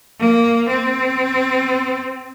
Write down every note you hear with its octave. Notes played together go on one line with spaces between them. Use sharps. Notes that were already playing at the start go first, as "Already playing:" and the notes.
A#3
C4